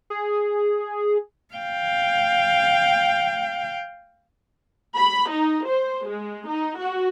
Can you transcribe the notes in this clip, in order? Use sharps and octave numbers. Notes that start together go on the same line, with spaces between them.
G#4
F5 G5
B5
D#4
C5
G#3
D#4
F#4